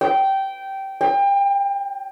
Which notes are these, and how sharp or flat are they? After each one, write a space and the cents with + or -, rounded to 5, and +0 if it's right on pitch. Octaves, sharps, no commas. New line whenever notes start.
G5 -15
G5 +30